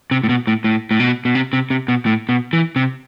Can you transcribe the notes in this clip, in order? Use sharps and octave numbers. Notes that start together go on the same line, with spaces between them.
C3
A2
B2
A2
A2
A2
B2
B2
C3
C3
C3
B2
A2
B2
E3
C3